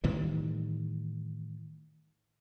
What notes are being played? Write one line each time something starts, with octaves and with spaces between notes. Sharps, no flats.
A2 D#3 E3 G3